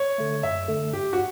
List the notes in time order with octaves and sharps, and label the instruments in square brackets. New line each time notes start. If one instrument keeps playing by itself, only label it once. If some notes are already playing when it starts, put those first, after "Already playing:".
Already playing: [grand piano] C#5
[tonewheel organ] D3 A3
[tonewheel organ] F#2 [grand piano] E5
[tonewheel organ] D3 A3
[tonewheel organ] G2 [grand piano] G4
[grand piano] F#4